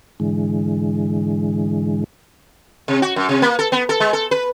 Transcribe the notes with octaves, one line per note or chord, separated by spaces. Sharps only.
G#2 D3 E3 G#3
C3
F#4
F#2
C3
A#3
A4
B3
A4
G#3
A4
B4